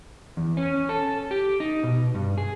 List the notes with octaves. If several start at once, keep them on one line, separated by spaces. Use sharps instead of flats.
E2
C#4
A4
G4
D#4
B2
G2
G#4